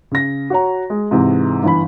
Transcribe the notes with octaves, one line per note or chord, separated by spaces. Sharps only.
C#3 A#6
F#4 C#5 A#5
G#3
G#2 C3 E3
G1 E3 B5